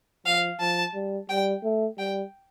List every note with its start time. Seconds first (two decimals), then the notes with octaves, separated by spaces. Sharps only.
0.26 F3 F5
0.60 F3 A5
0.94 G3
1.30 G3 G5
1.63 A3
1.98 G3 G5